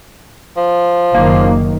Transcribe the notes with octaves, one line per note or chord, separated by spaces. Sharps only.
F3
F#1 D#3 A#3